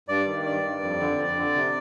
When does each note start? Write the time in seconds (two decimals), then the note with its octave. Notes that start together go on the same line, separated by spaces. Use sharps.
0.08 G2 D5
0.26 D#3
0.44 G2 D5
0.63 G2
0.82 F2
1.00 D3
1.18 F2
1.36 D3
1.55 C3